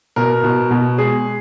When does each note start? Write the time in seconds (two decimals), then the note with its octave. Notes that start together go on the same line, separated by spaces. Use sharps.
0.16 B2 A#4
0.44 B2
0.71 B2
0.98 G#3 G#4